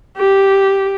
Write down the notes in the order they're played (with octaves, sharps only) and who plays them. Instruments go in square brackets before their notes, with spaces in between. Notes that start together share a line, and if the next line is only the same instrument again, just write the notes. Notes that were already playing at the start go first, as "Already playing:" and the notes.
[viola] G4